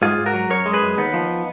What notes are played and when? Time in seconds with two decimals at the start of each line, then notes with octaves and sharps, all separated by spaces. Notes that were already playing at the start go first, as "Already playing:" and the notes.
0.02 G#2 F4 G#4
0.18 G#2
0.26 F#4 A#4
0.34 F#3
0.50 F#2 A#4 C#5
0.66 G#3
0.73 G#4 B4
0.82 F#2
0.98 D#2 B3 D#4
1.14 F3